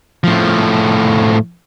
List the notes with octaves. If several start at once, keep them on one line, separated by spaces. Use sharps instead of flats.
A2 F3